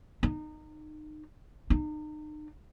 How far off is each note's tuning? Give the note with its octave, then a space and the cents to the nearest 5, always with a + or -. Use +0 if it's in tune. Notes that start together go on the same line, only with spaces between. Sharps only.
D#4 -25
D#4 -40